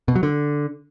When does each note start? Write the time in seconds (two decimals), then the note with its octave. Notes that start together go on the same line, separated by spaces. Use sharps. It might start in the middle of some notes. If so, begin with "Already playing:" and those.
0.08 B2
0.16 F#3
0.23 D3